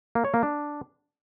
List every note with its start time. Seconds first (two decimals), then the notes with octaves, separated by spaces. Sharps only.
0.15 A#3
0.25 C#5
0.34 A#3
0.43 D4